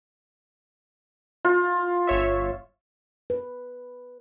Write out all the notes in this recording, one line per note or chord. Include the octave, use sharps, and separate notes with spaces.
F4
G1 C#5 E5
B4